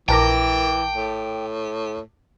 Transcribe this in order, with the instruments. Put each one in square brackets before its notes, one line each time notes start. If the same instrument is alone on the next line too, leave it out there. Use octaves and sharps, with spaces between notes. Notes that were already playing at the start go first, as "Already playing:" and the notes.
[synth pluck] A#1 A#4 A#6 [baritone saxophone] E3 [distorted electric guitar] G5 [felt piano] A5 D6
[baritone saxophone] A2